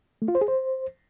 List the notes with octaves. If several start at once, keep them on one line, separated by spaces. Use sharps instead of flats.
A3
F4
C5
G#4
C5